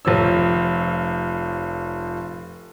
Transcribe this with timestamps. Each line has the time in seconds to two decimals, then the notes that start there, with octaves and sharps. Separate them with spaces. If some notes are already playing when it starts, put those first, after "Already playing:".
0.05 F1 F3 C#5 E6